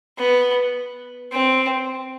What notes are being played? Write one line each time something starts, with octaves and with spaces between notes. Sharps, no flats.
B3
C4